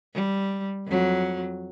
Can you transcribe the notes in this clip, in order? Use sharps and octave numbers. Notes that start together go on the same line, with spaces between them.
G3
F2 F#3